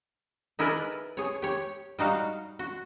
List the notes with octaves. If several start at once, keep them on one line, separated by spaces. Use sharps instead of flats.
D#4 E4 G#4 A#4 B4 D5
G#4 C#5
G4 C#5
G3 D#4 F#4 F5
F#4